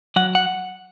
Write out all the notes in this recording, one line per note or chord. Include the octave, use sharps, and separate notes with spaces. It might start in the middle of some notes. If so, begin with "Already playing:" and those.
F#3 F#5
F#5